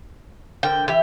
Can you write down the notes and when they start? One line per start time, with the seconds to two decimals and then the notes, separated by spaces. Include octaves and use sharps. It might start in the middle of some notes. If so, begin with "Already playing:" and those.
0.63 D3 A#4 C5 G5
0.88 E3 G4 E5